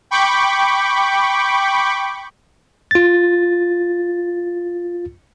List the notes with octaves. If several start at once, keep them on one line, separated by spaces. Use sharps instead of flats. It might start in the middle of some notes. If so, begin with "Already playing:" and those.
G5 B5 C#6 D6
F4 A6